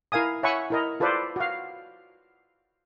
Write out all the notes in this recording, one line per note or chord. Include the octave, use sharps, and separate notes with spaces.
E4 A#4 F5 G#5 D#6
C#5 E5 F#5 G#5 B5 C#6
E4 A#4 D#5
F4 A4 B4 C5 D5
F#4 F5